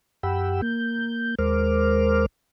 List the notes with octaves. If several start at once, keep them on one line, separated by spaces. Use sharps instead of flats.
F#2 G4 F#5 G5 B5 E6
A#3 G6
D#2 G#3 A#4 C5 D6 F6